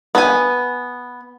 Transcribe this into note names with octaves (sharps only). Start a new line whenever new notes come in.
B3 G#5